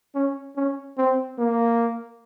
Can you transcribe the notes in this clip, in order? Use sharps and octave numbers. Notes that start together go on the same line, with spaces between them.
C#4
C#4
C4
A#3